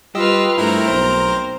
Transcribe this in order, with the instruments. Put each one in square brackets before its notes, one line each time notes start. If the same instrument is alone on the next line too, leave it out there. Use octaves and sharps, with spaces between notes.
[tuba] G3 [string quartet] F4 B4 F6 [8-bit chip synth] G4 D#5 E6
[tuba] G2 [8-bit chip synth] A3 E4 [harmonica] C4 A#4 [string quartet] A#5
[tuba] B1 [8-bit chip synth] C5